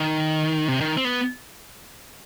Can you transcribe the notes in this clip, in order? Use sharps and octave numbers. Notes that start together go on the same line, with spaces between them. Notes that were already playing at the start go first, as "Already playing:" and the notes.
Already playing: D#3
C3
D#3
C4
B3